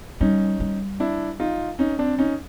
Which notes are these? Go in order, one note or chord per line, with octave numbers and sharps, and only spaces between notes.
G3 C#4 D#4
G3
D4 E4
D#4 F4
C#4 D#4
C4 D4
C#4 D#4